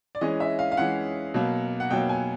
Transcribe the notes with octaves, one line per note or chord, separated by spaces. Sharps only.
D5
E3 G#3 C#4 D#5
E5
F5
F5
E3 G#3 C#4 F#5
B2 F#3 A#3
F#5
B2 F#3 A#3 G5
G#5